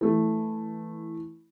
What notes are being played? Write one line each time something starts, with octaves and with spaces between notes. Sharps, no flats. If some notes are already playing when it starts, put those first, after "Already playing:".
E3 A3